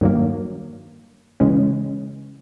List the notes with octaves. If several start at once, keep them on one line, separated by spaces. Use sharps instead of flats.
G2 D#3 F#3 A#3
C#3 E3 G#3 C#4